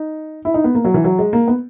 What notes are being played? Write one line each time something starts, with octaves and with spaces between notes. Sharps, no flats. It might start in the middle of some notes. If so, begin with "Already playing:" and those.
Already playing: D#4
E4
D#4
B3
A#3
F#3
E3
F#3
G#3
A#3
B3